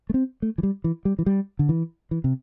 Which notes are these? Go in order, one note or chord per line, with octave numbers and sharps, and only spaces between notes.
A3
C4
A3
E3
G3
E3
G3
E3
G3
D3
E3
E3
C3